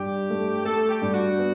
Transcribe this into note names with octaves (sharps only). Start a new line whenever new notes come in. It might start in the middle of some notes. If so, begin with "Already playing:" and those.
Already playing: G2 G4
A3
A3 A4
G4
G2
F#4
B3